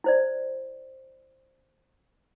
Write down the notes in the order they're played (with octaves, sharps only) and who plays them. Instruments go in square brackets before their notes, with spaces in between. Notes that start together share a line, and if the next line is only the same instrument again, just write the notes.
[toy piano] E4 C5 D5